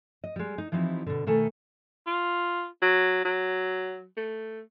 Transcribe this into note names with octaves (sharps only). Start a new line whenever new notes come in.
D#5
G3 G#3
D#4
E3 F3 C4 D#4 E4 G4
B2 D3
B2 D#3 A3 A4 G#5
F4
F#3
F#3
A3